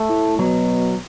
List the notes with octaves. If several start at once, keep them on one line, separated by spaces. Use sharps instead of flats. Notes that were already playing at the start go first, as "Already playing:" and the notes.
Already playing: A3
A2
B2 F#3